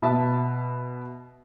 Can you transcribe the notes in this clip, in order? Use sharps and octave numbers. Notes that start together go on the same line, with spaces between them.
B2 E5 A5